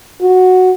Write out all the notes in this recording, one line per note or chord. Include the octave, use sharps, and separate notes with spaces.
F#4